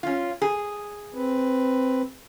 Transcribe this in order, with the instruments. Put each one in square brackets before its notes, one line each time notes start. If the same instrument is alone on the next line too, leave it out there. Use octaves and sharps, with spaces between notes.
[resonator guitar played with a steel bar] C#4 F4
G#4
[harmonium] C4 B4